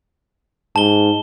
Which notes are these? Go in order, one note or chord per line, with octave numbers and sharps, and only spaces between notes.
G#2 A5 G7